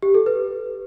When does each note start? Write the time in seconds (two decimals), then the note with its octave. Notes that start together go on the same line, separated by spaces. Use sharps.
0.03 G4
0.14 A4
0.26 B4